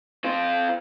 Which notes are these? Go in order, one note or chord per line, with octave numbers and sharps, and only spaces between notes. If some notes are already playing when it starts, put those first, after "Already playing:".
C4 F4